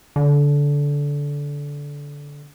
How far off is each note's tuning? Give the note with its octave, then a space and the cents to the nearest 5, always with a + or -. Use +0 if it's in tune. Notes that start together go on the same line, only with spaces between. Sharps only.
D3 -20